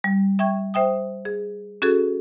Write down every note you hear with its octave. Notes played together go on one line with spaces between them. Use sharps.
G3
E5 G5 C#6 G#6
C5 E5 G5 D#6
G#4
C#4 F#4 G#4 A4